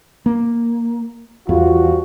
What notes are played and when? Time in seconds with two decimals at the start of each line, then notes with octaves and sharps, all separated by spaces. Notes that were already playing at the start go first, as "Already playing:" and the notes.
0.26 A#3
1.49 E2 F3 G3 F4 F#4